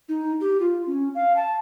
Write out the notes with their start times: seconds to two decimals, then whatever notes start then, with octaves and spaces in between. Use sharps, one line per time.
0.09 D#4
0.41 G4
0.60 F4
0.87 C#4
1.15 F5
1.36 A5